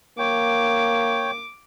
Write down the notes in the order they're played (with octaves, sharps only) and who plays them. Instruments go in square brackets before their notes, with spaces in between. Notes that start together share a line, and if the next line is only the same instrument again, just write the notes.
[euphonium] A#3 [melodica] C#5 G5 [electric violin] D6